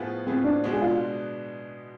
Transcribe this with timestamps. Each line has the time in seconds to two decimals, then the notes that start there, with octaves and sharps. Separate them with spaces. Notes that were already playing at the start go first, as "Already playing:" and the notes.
Already playing: A2 F3 B3 F4 G#4
0.27 A2 F3 B3 C4 F4 G#4
0.44 D4
0.64 B2 G#3 B3 D4
0.73 G#4
0.82 F4